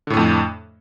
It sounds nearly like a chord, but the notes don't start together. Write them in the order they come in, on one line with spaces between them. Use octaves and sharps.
D3 A2 A3 F2